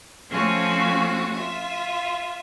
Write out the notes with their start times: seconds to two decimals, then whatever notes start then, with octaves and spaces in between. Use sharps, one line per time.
0.31 F3 A3 C4 C#4 F4 F#4
1.34 F4 E5